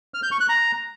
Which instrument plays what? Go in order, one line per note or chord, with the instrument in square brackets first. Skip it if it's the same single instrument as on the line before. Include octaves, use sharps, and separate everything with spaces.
[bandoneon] F6
G6
C#6
F#6
A#5